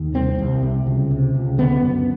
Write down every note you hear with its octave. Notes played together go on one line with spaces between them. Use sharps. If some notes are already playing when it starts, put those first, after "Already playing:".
Already playing: D#2
C2 C4
C2
C3
C#2
C3
C#2
D3 B3
F#2